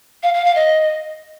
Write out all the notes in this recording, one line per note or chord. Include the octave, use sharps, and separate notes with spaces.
F5
F5
F5
D#5